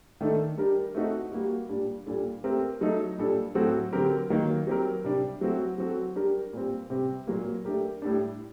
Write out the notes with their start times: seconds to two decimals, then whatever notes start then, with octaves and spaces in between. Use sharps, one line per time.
0.21 D#3 A3 D4 A4
0.57 G3 D4 G4 A#4
0.95 A3 C4 D#4 F#4 A4
1.32 G3 A#3 F#4
1.69 A#2 G3 D4
2.06 A#2 G3 D4 A4
2.44 A3 C4 G4 A#4
2.81 F#3 A3 D#4 A4
3.18 A#2 G3 D4 A4
3.55 A2 F#3 C4 F#4 A4
3.93 D3 F#3 C4 G4 A#4
4.30 D#3 F#3 A#3
4.67 F#3 C4 G4 A#4
5.04 C3 G3 D4
5.41 F#3 A3 C4 F#4
5.78 F#3 C4 F#4 A4
6.16 G3 D4 G4 A#4
6.53 A#2 G3 C4
6.90 C3 G3 C4 G4
7.27 A#2 F#3 A#3
7.65 A3 D4 G4 A#4
8.02 A2 G3 D4